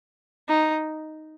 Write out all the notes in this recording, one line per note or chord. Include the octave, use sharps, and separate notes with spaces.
D#4